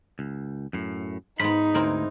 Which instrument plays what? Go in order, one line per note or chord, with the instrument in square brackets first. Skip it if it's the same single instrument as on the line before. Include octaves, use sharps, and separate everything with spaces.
[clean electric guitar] C#2
F#2 A2
[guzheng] G#2 B3 [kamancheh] D#4 [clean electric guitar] B5
[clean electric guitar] D2 [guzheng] C4 E4 A#4